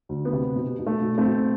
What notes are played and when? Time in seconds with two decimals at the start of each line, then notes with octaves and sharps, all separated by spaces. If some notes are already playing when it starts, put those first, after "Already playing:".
0.09 D2
0.25 B3
0.33 C3
0.56 B2
0.79 B2
0.87 A3
1.02 B2
1.18 A3 C4
1.26 B2